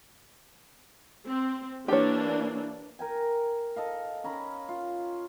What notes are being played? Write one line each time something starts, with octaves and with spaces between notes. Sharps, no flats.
C4
E3 A#3 D4 G4 C#5
A#4 G5 G#5
A4 D#5 F5
C#4 A#5 B5
F4